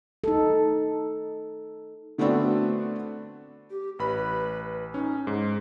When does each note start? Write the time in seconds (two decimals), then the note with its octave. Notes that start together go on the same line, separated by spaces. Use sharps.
0.24 D#4 A4
2.18 D3 A3 B3 C4 D4 F#4
3.71 G4
3.99 A1 B4 B5
4.94 C#4 D#4
5.27 G#2